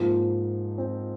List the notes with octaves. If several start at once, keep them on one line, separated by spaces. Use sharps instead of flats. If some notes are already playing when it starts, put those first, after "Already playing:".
Already playing: G#2 F3 A#3
C4